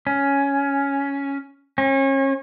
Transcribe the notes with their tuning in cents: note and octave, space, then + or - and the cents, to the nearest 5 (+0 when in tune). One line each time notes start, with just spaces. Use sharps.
C#4 +5
C#4 -35